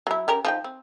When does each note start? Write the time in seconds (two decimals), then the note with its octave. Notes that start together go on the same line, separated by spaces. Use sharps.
0.07 F#3 E4
0.28 C#4 G4 A#4
0.45 F3 D#4 G5
0.64 C4